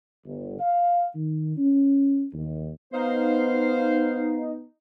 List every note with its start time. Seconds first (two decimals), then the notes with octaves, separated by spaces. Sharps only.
0.25 G1
0.60 F5
1.15 D#3
1.58 C#4
2.33 D#2
2.93 B3 D#4 C5 F5